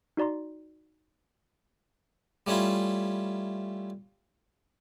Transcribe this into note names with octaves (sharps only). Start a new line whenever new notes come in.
D#4 F#4 D5 A#5 C6
G3 A3 C#4 E4 F4